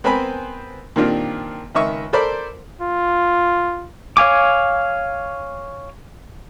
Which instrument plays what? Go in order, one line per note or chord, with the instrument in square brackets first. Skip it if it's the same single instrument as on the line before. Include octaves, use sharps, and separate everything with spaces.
[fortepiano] B3 C4 A#4 C5 G#5 B5
A#2 D#3 C4 D4 F4 G4
C#2 D#3 D#5 E5 C#6
A4 A#4 C5 D5 B5 C6
[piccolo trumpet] F4
[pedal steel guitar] C#5 F5 G#5 D6